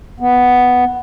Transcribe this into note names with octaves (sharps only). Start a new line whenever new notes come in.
B3